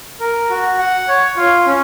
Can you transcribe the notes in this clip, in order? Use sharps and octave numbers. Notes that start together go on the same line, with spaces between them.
A#4
F#4
F#5
C#5
F4
C#4